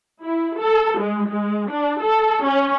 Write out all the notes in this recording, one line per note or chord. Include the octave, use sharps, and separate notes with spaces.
E4
A4
G#3
G#3
D4
A4
C#4